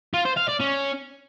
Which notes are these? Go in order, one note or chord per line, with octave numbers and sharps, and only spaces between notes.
F4
C5
F5
D5
C#4